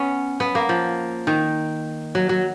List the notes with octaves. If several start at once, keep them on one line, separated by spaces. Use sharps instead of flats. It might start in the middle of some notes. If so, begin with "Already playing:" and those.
Already playing: B3 C#4
B3
A#3
F3
D#3
F#3
F#3